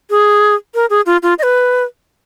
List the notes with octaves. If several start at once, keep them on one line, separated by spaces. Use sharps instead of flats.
G#4
A#4
G#4
F4
F4
D#5
B4